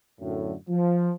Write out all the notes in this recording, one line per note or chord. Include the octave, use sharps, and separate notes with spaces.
F#2 A2 D3
F3